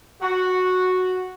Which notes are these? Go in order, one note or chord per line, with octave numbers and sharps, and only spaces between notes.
F#4